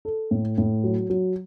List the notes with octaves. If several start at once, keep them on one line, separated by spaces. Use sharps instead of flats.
A4
A2
A2
F#3
F#3